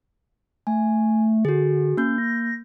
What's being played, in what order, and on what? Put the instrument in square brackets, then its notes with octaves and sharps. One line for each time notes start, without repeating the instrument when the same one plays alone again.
[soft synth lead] A3 [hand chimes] G#5
[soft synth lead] D3 [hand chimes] F#4 G#4
[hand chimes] A#3 G6 [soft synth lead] C#4
[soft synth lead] A#6